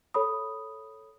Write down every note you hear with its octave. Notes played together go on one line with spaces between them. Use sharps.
A4 C#5 B5 D#6